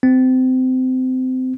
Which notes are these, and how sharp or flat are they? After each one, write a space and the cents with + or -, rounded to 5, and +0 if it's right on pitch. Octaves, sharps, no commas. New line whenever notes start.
C4 -25